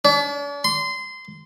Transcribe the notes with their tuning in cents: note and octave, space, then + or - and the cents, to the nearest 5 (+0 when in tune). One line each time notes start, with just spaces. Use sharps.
D4 -45
C6 -20